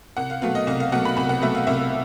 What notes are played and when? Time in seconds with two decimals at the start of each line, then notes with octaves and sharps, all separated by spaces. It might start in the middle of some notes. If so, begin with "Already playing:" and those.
0.17 C2 F#5
0.30 F5
0.42 B2 F#3 A3 F5
0.55 D#5
0.67 C2 F5
0.80 F5
0.92 B2 F#3 A3 F#5
1.05 B5
1.17 C2 B5
1.29 F#5
1.42 B2 F#3 A3 E5
1.55 F5
1.67 C2 E5